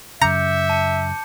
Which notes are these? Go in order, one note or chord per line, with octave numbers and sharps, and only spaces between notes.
F#2 C#3 E5 A#5 D6 G6 C#7
A5 C#7